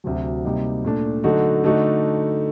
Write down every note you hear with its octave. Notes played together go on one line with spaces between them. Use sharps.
D2 C3 F#3
C3 G3 A#3 D#4
A#2 A3 D4
D3 F#3 A3 D#4 F#4
D3 A3 D#4 F#4